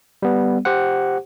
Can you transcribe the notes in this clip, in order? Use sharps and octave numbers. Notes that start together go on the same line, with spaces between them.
G3 B3
G4 C5 F#5